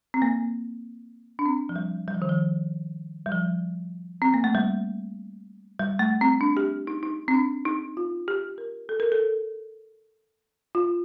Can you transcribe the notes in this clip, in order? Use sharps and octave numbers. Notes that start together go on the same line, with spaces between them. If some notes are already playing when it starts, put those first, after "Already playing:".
C4
A#3
D4
C4
F3
G3
G3
F3
D#3
F3
G3
F3
C4
A#3
A3
G3
G3
A3
C4
D4
G4
D#4
D#4
C4
D4
D#4
F4
G4
A#4
A4
A#4
A4
F4